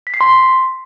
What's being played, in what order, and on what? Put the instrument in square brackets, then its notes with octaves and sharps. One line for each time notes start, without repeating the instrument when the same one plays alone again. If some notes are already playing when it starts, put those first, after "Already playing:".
[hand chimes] B6
C7
C6